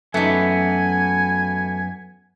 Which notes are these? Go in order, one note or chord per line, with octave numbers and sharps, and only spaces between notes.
F#2 E3 A3 B3 D#4 G#5